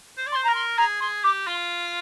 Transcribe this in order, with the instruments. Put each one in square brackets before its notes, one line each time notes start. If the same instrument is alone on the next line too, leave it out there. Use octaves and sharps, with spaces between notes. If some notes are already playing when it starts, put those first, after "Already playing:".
[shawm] C5
D5
[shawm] C5 [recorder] C6
[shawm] A#4 [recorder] A#5
[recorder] C6
[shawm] G#4 [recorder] A#5
[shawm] G#4 [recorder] C6
[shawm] G4 [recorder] D6
[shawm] F4 [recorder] C6